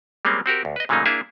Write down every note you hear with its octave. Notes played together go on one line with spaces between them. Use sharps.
G3 G#3 A#3 C4 C#4
C4 F#4 G4 A#4
D2
B4 D#5
A#2 C#3 F#3 A3 A#3 D#4
A#3 D4 E4 G#4 E5 F5